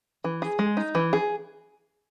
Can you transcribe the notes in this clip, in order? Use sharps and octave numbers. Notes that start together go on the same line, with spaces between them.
E3
G#4
G#3
D#4
E3
G#4